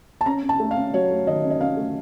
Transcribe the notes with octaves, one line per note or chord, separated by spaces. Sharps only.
A5
C#4 A#5
C#4
A5
A3
F5
C#4
F#3 C#5
A3
D#3 D#5
C#4
D#5
C#4 F5
A3